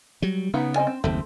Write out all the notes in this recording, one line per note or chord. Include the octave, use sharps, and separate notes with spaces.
F#3 G3
C#3 B3 D#4 F5
C4 D#5 G#5
C4
F#1 D#2 A3 C4